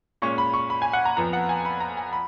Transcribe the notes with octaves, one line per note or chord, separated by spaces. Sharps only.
A#2 G#3 C#4 C#6
B5
C#6
B5
G#5
F#5
A#5
F2 F3 B3 A#5
F#5
G#5
B5
A#5
G#5
B5